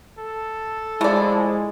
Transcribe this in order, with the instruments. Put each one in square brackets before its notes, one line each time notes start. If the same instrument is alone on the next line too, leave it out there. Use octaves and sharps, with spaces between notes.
[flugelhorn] A4
[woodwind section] F3 E4 [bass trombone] G#3 [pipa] A3 D5